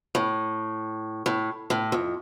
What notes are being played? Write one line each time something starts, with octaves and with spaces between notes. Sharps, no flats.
A2
A2
A2
F2